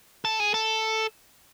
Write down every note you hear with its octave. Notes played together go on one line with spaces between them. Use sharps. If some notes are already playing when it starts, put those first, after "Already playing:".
A4
G#4
A4